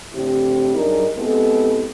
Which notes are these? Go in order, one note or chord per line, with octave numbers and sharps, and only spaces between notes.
A2 D3 C4 E4 G4
F#2 G3 D4 D#4 G#4 A#4
G#3 B3 C4 E4 G4 A4